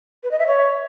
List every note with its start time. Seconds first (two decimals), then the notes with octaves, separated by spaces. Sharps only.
0.23 B4
0.31 D#5
0.39 E5
0.47 C#5